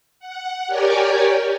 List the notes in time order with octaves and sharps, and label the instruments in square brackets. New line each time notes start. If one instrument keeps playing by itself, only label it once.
[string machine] F#5
G4 A#4 C#5 D5 G5 G#5